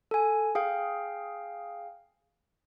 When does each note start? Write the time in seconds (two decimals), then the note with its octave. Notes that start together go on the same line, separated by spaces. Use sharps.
0.11 A4 G#5
0.55 G#4 F5 G5